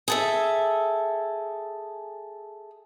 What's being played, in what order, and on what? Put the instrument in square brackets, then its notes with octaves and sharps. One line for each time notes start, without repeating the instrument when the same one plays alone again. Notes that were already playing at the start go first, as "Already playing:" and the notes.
[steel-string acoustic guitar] G#4 A4 E5